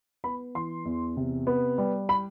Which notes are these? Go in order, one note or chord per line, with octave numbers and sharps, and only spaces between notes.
B3 B5
E3 C6
E2
C3
B3
G3
B5